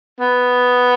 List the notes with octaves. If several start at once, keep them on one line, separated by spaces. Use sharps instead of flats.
B3